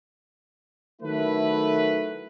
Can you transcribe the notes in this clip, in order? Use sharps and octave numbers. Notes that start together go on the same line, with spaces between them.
D#3 F#3 A3 E4 B4